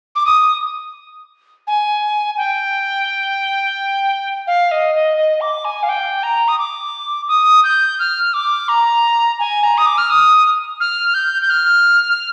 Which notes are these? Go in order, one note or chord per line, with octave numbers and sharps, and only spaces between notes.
D6
D#6
G#5
G5
F5
D#5
D#5
D#5
D6
G#5
F5
G5
A#5
D#6
D6
D#6
G6
F6
D6
A#5
G#5
A#5
D#6
D6
F6
D#6
F6
G6
G6
F6